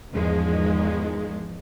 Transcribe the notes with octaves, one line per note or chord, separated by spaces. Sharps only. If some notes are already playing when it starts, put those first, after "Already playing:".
E2 G#2 D#3 F3 G#3